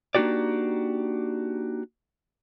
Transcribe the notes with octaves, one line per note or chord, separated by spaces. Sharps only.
A#3 D4 D#4 F#4 G4 D5